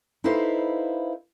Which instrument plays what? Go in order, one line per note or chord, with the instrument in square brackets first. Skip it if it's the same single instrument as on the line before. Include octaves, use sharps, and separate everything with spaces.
[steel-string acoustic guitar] D#4 E4 A4 B4 C5 F5